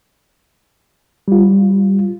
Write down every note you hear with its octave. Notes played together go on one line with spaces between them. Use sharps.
G3 F4